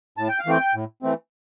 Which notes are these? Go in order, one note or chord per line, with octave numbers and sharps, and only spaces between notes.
A2 A5
G5
F5
E3 A3 C4 G5
A2
E3 A3 C4